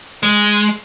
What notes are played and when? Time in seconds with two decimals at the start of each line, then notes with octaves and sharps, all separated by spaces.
0.23 G#3